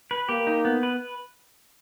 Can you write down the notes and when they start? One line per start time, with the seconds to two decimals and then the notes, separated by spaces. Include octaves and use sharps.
0.11 B4
0.29 A#3 G4
0.47 D#4
0.65 B3
0.83 B4